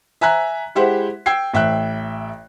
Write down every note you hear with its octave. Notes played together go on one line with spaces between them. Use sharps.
E5 G#5 A#5 F#6 B6
G#3 E4 G4 C5 E5 F#5
G5 E6 G#6 C7
A1 E5 G5 F#6